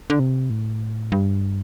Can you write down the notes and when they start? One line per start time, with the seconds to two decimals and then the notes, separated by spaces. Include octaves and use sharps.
0.10 D3
0.20 C3
0.50 A2
1.12 G2